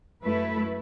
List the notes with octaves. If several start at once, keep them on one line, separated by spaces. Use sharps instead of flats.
F#2 A3 E4 B4